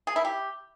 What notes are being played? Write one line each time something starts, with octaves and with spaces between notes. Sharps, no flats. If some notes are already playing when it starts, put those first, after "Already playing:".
G#4
E4
G4